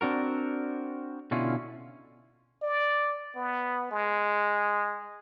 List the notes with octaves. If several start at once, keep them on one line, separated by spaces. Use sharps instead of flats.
C4 D4 F#4 A#4
B2 D3 C#4 E4 F4
D5
B3
G#3